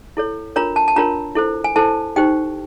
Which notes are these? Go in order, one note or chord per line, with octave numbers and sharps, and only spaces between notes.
E4 A4 C#5
D4 F4 A#4 C#5 A#5
A5
A5
D4 F4 A#4 C#5 A#5
E4 A4 C5
G#5
E4 A4 C5 A5
D#4 G4 C5 G5